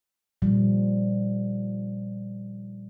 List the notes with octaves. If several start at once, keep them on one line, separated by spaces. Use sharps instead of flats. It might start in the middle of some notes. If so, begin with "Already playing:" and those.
A#2 F3 G3